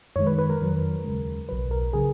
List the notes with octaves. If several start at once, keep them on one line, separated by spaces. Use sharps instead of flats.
F#2 D#3 G#3 C#5
B4
B4
A#4
F2 D#3 F#3
D#2 C#3 G#3
B1 B2 F#3 B4
A#4
C#3 F#3 G#4